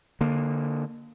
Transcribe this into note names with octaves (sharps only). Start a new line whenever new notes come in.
D3 A#3